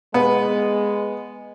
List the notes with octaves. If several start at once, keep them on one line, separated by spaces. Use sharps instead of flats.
G#3 B3